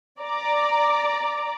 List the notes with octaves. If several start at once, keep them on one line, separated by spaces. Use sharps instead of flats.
D5 A#5 D6